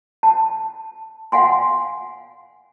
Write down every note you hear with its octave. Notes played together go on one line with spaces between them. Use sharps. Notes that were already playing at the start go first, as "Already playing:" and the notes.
A5
F5 F#5 G#5 C6